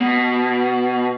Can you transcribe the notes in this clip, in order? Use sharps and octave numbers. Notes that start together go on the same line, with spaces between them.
B2